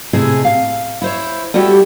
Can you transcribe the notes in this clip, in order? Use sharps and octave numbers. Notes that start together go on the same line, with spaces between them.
A2 C3 E4 G#4 D#5 G#5
F5
E4 C5 C#5
G3 E4 F#4 G4 A4 C#5